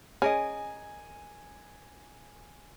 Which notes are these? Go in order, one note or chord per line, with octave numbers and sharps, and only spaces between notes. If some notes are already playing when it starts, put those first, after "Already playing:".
C#4 G#4 A#4 D#5 G#5